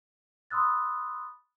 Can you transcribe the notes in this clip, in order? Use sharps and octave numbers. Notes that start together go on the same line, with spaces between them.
B5 C6 D#6 E6 F#6 A6